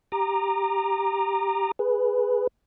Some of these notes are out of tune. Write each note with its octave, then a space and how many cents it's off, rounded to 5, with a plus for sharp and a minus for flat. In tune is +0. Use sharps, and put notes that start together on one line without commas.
G4 +0 A#5 +0 D6 +45
G#4 +0 B4 +0